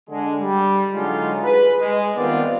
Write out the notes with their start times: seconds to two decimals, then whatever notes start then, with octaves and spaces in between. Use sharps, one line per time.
0.10 D3 G#3
0.41 G3
0.94 D3 F#3 G#3 D4 D#4 F4
1.44 G#4 B4
1.80 G#3
2.17 D#3 G3 B3 C4 F4 D5